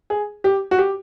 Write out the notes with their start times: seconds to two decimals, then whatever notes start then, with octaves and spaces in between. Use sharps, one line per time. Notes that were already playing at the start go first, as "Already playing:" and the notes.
0.10 G#4
0.44 G4
0.71 F#4
0.78 G4